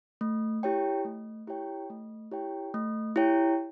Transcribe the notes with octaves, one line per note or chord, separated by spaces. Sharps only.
A3
E4 G4 C#5 G5
A3
E4 G4 C#5 G5
A3
E4 G4 C#5 G5
A3
E4 G4 C#5 G5